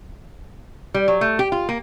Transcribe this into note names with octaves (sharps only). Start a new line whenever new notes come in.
G3
F#3
A3
G4
F4
A#3